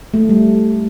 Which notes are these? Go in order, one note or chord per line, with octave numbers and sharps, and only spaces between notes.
A3
G3